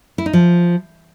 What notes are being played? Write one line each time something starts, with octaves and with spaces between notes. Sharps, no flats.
E4
D#4
F3